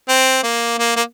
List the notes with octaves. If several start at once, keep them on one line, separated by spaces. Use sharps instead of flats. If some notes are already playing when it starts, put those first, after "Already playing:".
C4
A#3
A#3
A#3